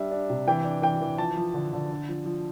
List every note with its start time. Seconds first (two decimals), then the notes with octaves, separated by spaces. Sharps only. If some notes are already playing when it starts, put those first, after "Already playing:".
Already playing: G3 D4 E5
0.11 D4
0.30 C3
0.48 E3 G5
0.64 D4
0.82 E3 G5
1.01 E3
1.18 F3 A5
1.37 F3
1.54 D3
1.73 D3
1.91 D4
2.09 F3
2.26 F3